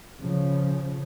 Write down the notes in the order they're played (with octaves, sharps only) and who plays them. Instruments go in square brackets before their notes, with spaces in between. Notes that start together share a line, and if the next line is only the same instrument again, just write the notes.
[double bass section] C#3 F3